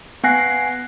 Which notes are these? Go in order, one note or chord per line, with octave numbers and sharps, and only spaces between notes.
B3 F#5 G#5 F#6 A#6 C7